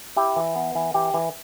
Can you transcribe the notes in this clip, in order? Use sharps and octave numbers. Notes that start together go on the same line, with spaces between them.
E4 G4
E3
B3
E3
E3 G4
E3